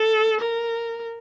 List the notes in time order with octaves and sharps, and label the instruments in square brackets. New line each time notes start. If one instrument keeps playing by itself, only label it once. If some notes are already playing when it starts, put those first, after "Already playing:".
Already playing: [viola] A4
A#4